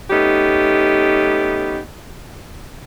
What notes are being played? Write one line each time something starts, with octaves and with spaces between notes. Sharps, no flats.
A3 B3 C#4 D#4 G4